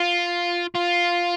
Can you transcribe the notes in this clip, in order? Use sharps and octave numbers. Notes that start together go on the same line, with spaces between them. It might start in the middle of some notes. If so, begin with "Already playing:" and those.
Already playing: F4
F4